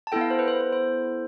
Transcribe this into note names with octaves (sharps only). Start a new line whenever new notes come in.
A5
B3 E4 A4 G5
F5
C5
B4
C5
C5
C5